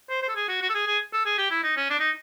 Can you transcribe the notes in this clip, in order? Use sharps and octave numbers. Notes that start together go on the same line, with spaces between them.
C5
C5
A4
G#4
F#4
F#4
A4
G#4
G#4
A4
G#4
G4
E4
D#4
C#4
D4
D#4